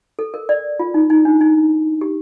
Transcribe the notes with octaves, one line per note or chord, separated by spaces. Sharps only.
A4
A#4
D5
F4
D#4
D#4
D4
D#4
G4